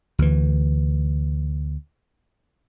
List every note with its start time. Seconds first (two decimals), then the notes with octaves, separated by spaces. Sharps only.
0.19 D2 E3